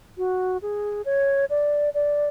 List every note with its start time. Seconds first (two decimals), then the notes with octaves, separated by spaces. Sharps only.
0.18 F#4
0.62 G#4
1.06 C#5
1.50 D5
1.94 D5